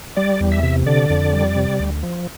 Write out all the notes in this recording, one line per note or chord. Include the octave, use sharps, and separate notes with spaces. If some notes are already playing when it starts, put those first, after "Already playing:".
G3 D5
E2
E5
C3
D3 D5
F2
G3
C3
D2
F3